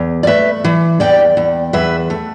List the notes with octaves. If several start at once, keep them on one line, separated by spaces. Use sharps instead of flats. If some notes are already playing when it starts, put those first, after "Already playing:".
Already playing: E2
D5
A3 B4 E5
E3
E2 D5 G5
E2
E2 B4 E5
A3